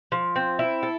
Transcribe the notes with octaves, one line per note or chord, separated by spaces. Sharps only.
F3
C4
E4
A4